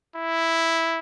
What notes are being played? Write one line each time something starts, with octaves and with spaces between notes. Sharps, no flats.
E4